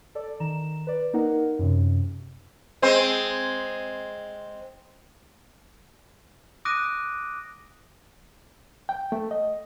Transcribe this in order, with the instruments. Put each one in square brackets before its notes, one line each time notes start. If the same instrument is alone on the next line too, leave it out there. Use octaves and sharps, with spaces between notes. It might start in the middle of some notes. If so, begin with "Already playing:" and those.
[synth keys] A4 D5
D#3 A#5 E7
B4 D5
A#3 D#4 A#4 F#5
F#2 C3
[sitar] G#3 C4 C5
[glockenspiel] D6 D#6 F#6 A#6 D7 D#7
[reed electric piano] G5
A3
D#5